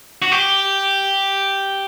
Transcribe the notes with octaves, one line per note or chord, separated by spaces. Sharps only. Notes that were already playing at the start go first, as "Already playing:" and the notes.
F#4
G4